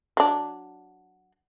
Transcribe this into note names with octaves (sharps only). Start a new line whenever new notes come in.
F#3 D4